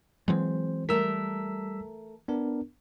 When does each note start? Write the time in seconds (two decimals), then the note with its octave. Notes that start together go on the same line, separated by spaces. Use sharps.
0.28 E3 F#3 G#3 C4 C5
0.89 G3 A3 A#4 E6 B6
2.28 B3 D4 A#4